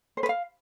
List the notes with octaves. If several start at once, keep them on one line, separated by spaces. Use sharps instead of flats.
C5
B4
F5